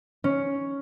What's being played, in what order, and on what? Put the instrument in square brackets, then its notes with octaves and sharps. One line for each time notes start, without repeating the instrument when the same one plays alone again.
[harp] C#4